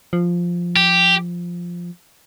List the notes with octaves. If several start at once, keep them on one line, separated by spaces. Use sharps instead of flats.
F3
G4